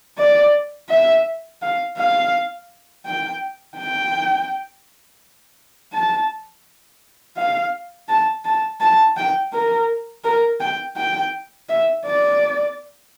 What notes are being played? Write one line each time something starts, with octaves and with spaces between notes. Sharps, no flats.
D5
E5
F5
F5
G5
G5
A5
F5
A5
A5
A5
G5
A#4
A#4
G5
G5
E5
D5